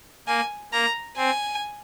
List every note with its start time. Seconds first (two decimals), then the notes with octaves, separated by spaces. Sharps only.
0.27 A#3 G#5
0.72 A#3 A#5
1.17 C4 G#5